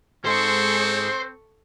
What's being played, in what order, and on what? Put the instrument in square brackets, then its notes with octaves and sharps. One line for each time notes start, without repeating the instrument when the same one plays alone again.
[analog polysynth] G#2 G#3 [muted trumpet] C4 [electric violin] A4 C#6 [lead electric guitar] C5